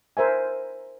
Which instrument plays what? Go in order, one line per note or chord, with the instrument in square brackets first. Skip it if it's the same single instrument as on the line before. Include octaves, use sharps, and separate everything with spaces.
[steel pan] A#4 C5 E5 G#5